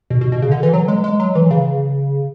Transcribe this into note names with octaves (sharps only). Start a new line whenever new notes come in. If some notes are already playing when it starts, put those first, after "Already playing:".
B2
B2
B2
C#3
D3
E3
F#3
G#3
G#3
F#3
E3
C#3